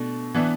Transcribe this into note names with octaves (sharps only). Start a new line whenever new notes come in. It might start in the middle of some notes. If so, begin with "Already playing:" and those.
Already playing: B2 A3 D4
E3 B3 D4